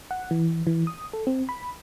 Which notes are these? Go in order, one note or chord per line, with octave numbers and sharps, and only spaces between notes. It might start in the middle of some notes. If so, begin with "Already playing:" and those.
F#5
E3
E3
D#6
A4
C4
B5